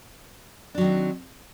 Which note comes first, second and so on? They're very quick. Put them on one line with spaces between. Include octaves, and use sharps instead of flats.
D4 F#3 D#3 C4